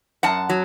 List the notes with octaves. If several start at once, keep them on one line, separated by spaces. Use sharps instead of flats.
F#2 F#5 A5
F#3